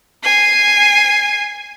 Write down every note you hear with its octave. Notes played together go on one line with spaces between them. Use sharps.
G#5 C7